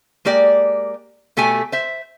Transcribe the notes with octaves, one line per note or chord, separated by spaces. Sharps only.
G#3 A#3 G4 D5
B2 A3 G4 A4 G#5
C5 E5